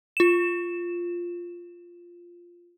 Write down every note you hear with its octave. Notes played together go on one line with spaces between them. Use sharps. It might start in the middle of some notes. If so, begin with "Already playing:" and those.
F4 E7